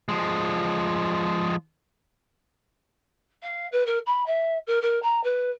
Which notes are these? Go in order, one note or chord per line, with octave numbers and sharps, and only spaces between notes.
F3 G#3
F5
B4
A#4
B5
E5
A#4
A#4
A#5
B4